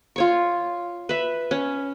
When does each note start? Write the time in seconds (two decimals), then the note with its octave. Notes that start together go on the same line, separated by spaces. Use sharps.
0.16 F4 C#5 C#6
1.09 B4 E5
1.51 C#4